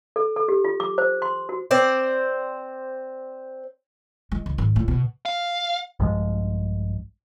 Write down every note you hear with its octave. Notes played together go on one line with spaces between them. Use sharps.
A4
A4
G4
F4
D6
C5
C6
F#4
C4 C5 D5
G#3
C#2
G#1
A2
B2
F5
A#1 G2 F3 G#3